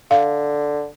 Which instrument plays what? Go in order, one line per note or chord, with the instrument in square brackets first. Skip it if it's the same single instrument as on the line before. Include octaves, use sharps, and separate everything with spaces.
[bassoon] D3 [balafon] F5